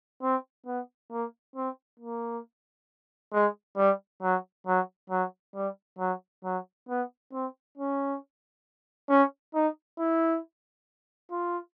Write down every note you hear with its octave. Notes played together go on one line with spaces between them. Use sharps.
C4
B3
A#3
C4
A#3
G#3
G3
F#3
F#3
F#3
G3
F#3
F#3
B3
C4
C#4
C#4
D#4
E4
F4